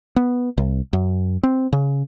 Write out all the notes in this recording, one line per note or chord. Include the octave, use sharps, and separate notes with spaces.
B3
C2
F#2
C4
C#3